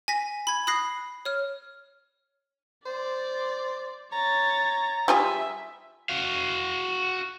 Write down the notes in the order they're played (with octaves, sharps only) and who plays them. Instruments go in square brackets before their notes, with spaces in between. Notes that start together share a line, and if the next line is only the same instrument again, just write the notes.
[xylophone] G#5 A#6 B6
B5 G#6
B5 D#6 F#6 A#6 C7
C#5 F6
[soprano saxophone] C5 [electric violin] D5
[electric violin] C#5 A6 [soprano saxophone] A#5
[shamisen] G3 F4 G#4 [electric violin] E5
[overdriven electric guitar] F#4 F5